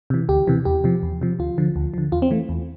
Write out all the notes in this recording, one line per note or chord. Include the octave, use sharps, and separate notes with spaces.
C3 E3
D2 G4
C3 E3
E2 G4
C3 F3
E2
C3 F3
D2 F4
D3 F3
D2
D3 F3
E2 F4
C4
E3 A3
E2